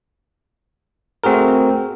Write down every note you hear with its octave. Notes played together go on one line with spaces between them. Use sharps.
A3 C4 F#4 G#4 A#4